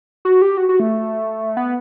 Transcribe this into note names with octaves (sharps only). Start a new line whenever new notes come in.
F#4
G4
F#4
F#4
A3
B3